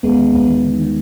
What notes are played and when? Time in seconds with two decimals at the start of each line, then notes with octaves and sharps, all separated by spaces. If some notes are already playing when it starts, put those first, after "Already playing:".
0.03 D#2 G#3 B3
0.19 D#3
0.33 D#2 G#3 B3
0.48 D#3
0.64 D#3
0.79 D#3